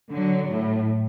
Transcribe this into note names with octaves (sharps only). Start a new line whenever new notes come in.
D3 F#3
A2